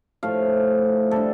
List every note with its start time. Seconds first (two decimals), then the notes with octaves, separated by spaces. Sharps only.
0.23 A2 F3 A3 F5
1.11 G3 D4 A4